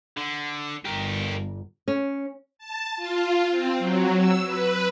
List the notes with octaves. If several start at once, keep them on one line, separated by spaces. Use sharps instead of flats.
D3
G1 G4 A#4
C#4
A5
F4
C4
F#3
E6
B4